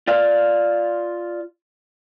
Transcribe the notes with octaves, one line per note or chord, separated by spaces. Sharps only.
F4 D5 F5